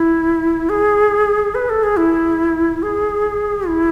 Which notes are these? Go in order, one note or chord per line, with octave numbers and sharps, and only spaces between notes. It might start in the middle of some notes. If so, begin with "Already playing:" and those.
Already playing: E4
G#4
B4
A4
G#4
E4
G#4
E4